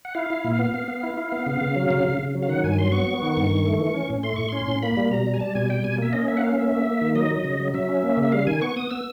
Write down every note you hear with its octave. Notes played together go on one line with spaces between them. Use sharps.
F#5
E4 F5
E4
A#2
B3
B3
B3
E4
E4
B3
C#3
C#3
F#3
C#3
C#3
C#3
F#3
F5
D#3 F#5
G2 G#5
F#3 C6
B3 C#6
B3
D#3
G2
D#3
A3
E3
C#4
A2
A3 C6
A2 C#6
C#4 C6
A2
A#3 B5
G3
B2 A#5
G3
G#5
G3 A5
B2 G#5
G3 G5
B2 G#5
A#3 E5
C#4 D#5
A#3 E5
F#5
C#4 F5
A#3 E5
A#3
A#3
D#3
F#3 D#5
F#3
C#3
F#3
F#3 E5
C#4
A#3
C#3
E5
G3 F5
D#3 G#5
B3 C#6
B3 D#6
B3 E6